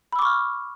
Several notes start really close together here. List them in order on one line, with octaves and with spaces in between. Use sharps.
B5 E6 D6 C#6 F6